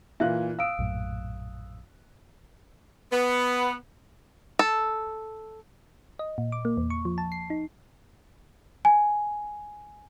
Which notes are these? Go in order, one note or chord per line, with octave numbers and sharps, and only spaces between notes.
A#2 E3 E5 F5 F#6
F5 D#6 E6 D7
A#1 F#2 A2
B3
A4
D#5
A#2
D6
A#3
E2
C#6
F3
A5
C7
D#4
G#5